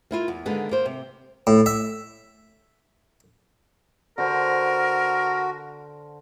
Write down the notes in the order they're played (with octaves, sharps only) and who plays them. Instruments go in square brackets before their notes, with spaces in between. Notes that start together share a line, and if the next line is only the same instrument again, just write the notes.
[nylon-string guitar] A#3 E4 F4
E2
D3 D#3 G#3 A#3 B3
A#3 C5
C3
[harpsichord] A2
E5
[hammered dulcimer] D3 C5 [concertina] F#4 [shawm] A#4